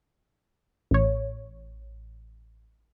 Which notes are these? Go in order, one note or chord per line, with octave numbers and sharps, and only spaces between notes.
A1 C#5